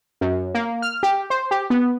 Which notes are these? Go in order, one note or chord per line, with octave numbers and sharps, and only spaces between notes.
F#2
A#3
F6
G4
C5
G4
B3